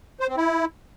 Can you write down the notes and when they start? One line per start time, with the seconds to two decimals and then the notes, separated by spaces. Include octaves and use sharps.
0.20 C5
0.28 C4
0.37 E4